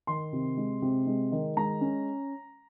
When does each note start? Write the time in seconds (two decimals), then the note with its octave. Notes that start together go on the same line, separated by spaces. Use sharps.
0.07 D#3 C6
0.33 C3
0.57 G#3
0.82 C3
1.07 G#3
1.32 D#3
1.57 G#3 A#5
1.81 C#4